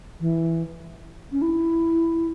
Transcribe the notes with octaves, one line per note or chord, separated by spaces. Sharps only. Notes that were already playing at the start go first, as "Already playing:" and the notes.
E3
C#4
E4